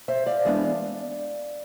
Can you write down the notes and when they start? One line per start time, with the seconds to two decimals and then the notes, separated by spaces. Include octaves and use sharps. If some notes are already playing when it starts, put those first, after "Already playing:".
0.08 C5 E5
0.26 D5 F5
0.45 E3 G#3 B3 D4